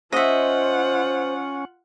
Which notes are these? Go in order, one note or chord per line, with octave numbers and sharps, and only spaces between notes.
C#4 F4 C5 D#5 E5 F#5